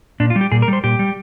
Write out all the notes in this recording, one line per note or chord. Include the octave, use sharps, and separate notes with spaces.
A#2 D4
F4
G3
G4
A#2 G#4
A#4
G3
C5
A#2 G4
G3